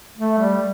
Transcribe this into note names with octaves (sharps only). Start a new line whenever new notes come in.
A3
G3